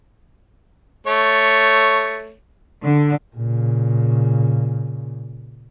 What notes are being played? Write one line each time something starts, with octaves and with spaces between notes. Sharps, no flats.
A3 C#5
D3
A#2 C#3